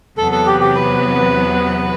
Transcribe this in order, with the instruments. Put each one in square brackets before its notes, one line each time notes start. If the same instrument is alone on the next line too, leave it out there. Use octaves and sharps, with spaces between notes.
[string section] E2 C3 F#3 B3 [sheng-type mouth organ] A4
[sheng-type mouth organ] A4
G4
G4
B4